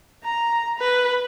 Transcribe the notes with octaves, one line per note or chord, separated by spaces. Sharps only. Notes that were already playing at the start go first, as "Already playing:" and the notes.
A#5
B4